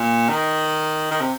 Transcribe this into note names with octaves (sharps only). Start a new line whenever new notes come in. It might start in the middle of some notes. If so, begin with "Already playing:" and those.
Already playing: A#2
D#3
D#3
C3